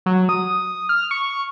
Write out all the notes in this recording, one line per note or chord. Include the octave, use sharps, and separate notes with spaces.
F#3
D#6
F6
C#6